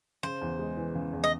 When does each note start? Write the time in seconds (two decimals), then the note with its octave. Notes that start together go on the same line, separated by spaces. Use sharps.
0.23 C#3 C5
0.41 E2
0.59 G#3
0.77 E3
0.95 C#3
1.13 E2
1.24 D#5